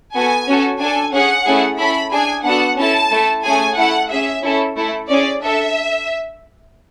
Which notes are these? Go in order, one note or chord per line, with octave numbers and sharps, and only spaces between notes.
B3 F#4 A4 G#5
C#4 F#4 A4
D4 A4 G#5
C#4 G#4 F#5
A3 C#4 E4 G#4
C#4 E4 A4 B5
D4 G#4 G#5
B3 D4 F#4 A4 F#5
C#4 E4 A4 A5
A3 E4 A4
A3 C#4 G#4 G#5
A3 E4 A4 F#5
C#4 G#4 E5
C#4 E4 A4
A3 E4 A4
C#4 G#4 D5
D4 A4 E5